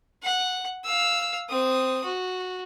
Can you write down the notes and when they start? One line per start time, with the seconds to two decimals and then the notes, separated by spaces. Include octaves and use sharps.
0.23 F#5
0.85 F5 E6
1.49 C4 D#6
2.04 F#4